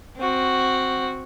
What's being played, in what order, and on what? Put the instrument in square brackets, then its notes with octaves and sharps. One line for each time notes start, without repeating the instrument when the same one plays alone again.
[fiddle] C4 F#4